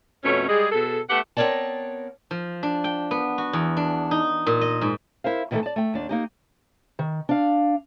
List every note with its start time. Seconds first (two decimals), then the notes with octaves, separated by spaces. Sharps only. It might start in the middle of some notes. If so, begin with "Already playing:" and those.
0.24 F2 B2 A3 C#4
0.49 G3 G#3 G#4
0.72 B2 G#4 A4
1.10 A3 B3 G4 F#5
1.37 B3 C4 A#4 C#5 D5 A5
2.31 F3
2.63 D4
2.84 G5
3.11 B3
3.38 F#4
3.53 E2
3.77 D4
4.11 D#4
4.47 A#2
4.61 D#5
4.81 G#2
5.24 E4 A#4 C5 F5
5.51 B2 D#3 E3 F#3 A3 A4
5.63 D5 A5
5.76 A3 G5
5.94 D#2 D4
6.09 A#3 D#4 G4
6.99 D#3
7.29 D4 F5